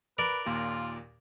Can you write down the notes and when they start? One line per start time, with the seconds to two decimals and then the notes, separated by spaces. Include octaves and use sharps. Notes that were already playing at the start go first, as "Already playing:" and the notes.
0.18 A#4 B4 D5
0.46 D#2 A#2 F4